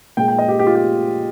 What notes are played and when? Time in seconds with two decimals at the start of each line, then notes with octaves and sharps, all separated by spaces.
0.17 A#2 G#3 G5
0.28 G5
0.38 D#5
0.48 G4
0.59 G4
0.67 F4
0.75 G4